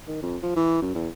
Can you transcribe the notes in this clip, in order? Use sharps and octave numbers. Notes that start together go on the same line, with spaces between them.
D#3
F2
F3
E3
F#2
E2